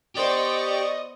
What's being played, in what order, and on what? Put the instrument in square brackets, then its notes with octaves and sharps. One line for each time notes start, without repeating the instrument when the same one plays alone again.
[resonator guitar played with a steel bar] B3 C5 [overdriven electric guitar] G4 [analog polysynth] D5 C#6 [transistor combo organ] D#5